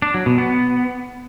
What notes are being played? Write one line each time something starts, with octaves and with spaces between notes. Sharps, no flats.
D4
F#3
B2
B3